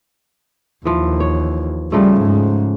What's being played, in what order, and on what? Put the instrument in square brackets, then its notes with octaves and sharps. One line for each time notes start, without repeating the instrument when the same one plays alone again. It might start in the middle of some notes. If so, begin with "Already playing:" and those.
[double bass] D#2 [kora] E3 F3
[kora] C#5
[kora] C#3 F3 A3 [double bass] G3
[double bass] G#2